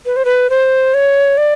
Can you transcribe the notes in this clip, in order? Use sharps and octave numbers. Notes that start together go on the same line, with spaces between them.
B4
C5
B4
C5
C#5
D5